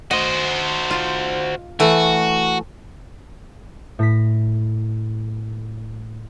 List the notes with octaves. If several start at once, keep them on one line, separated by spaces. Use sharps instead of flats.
F#4 C5 D#5
F4
E3 A3 F#4
A2 A#6 B6